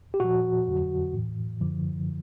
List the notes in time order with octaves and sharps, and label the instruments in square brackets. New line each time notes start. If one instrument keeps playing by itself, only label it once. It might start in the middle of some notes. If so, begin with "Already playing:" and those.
[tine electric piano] G4
A#2 F3 F#4
F2 D3 F#3
A2 E3
F#2 D3 F3